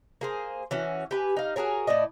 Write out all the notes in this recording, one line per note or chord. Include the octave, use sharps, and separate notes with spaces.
A#3 G#4 C5
E3 C#4 F#4
G4 B4 G#5
D#4 F5
F#4 G#4 A#4 C#5
A2 E4 D5 D#5